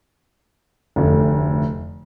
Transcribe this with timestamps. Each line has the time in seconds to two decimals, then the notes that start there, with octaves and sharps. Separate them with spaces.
0.96 F1 D2